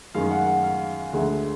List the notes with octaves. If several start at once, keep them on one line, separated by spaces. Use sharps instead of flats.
F#2 D#3 G#3 F5
F#5
F#5
F5
D2 D3 G#3